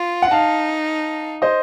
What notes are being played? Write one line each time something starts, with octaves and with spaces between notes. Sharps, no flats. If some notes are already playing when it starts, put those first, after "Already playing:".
Already playing: F4
F#5
D#4 F5 A5
C5 D#5